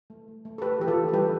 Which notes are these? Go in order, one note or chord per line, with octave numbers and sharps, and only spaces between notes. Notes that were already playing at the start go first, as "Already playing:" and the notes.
A3
A3
A3
A4
A3 G4 B4
E3 G4
F4 A4
E3
A4
G3 G4 B4